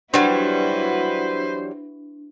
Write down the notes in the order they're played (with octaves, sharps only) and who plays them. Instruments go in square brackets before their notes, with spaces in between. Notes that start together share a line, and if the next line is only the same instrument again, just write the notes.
[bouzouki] E3 F#3 G3 [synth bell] D4 [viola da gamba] E4 F#4 B4 [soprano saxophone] C5